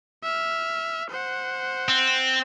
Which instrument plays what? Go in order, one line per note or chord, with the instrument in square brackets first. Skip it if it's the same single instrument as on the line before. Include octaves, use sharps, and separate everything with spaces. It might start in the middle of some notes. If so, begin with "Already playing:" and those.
[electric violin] E5 F6
C5 F#5
[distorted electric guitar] C4